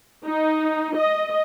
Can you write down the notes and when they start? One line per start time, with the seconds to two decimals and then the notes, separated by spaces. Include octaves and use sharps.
0.24 D#4
0.96 D#5